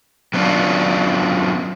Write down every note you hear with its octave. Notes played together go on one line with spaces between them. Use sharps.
F#3 B3 C#4 D4 E4 F4